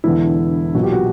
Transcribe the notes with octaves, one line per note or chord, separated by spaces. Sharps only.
E1 E2 D3 E4
B1 A#2 F#4
G4
F#4